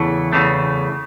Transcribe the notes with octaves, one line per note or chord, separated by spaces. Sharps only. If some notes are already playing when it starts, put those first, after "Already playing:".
Already playing: E2 C#3 E3 A3
E2 C#3 E3 A3